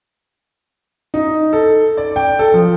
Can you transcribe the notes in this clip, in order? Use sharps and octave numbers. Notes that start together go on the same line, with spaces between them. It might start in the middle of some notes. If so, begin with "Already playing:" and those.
D#4
A4
D5
G5
A4
F3